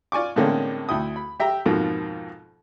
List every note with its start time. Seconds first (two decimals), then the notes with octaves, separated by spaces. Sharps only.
0.12 F4 D5 G#5 C#6 D6
0.36 A2 D3 G#3 A#3 C4 C#4
0.89 D2 E4 G5 D#6
1.16 B5
1.40 G4 E5 G5 A#5
1.66 F2 G#2 B2 F3 A#3